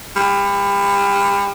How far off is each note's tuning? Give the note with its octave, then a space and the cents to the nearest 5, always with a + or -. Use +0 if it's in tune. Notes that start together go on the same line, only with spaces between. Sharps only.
G3 +35